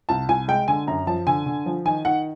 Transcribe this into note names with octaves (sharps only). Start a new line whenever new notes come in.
C2 A5
C2 G#5
G#3 G5
D3 G#5
F#2 A#5
F3 A5
D3 G#5
D3
F3
D#3 G#5
D#3 F#5